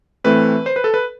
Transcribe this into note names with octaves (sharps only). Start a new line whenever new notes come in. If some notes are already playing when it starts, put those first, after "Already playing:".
A2 E3 A3 C4 B4
C5
B4
A4
B4